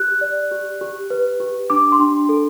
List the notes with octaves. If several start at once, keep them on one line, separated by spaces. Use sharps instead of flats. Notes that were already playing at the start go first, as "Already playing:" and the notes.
Already playing: G4 F#6
D5
G4
G4
B4
G4
D4 D6
C6
D4
A4